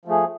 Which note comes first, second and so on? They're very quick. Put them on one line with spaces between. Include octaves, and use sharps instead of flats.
F3 A3 G#4